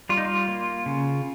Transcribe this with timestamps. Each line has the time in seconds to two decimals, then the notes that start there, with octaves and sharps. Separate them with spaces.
0.09 G3 F4
0.17 D#4
0.25 F4
0.48 A#3
0.86 C#3